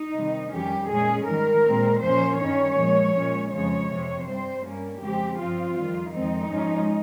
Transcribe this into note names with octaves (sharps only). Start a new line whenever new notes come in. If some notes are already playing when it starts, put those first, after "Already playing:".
Already playing: D#4
C3 D#3 G3
F2 D#3 G3 C#4 G4
A#2 G#3 C#4 G#4
G#2 D#3 G3 A#4
A#2 G#3 C4
A#2 F3 A#3 C#4 C5
G2 D#3 G3 C#4 C#5
A#2 F3 G#3
A#2 G#3 C#4
F2 C#3 F3 G#3 C#5
F2 C3 F3
G2 G3 C4 C5
G2 G3 A#3 C#4
F2 C#3 G#3 C4 G4
G2 F3 C4 F4
F2 D#3 G3
F2 D#3 G#3 C4 D#4
G#2 F3 G#3 C#4